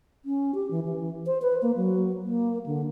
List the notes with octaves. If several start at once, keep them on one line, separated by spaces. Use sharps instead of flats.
C#4
G4
E3
E3
C5
B4
A#3
F#3
A#3
D3